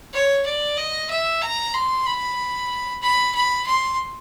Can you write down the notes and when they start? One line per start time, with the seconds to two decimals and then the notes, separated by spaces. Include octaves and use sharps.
0.13 C#5
0.46 D5
0.77 D#5
1.10 E5
1.41 A#5
1.74 C6
2.06 B5
3.02 B5
3.34 B5
3.67 C6